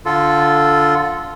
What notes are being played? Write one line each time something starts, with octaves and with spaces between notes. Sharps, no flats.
D3 F4 A4